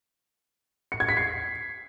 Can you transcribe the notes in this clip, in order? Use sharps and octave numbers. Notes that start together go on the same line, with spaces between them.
C#7
G#6
B6
C7